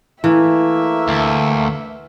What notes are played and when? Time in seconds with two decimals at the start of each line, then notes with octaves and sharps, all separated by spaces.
0.24 E3 A3 A#3 A#4 E5
1.08 D2